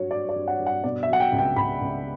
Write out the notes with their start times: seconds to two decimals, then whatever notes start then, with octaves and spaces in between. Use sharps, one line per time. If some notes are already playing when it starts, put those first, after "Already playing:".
Already playing: G2 F#3 F#4 C#5
0.11 G2 D5
0.29 D5
0.36 G2
0.48 F#5
0.59 G2
0.66 F#5
0.84 B2 D5
1.03 E5
1.08 F#3
1.13 F#5
1.20 G5
1.32 C#2
1.39 G5
1.56 C#2 B5
1.81 C#2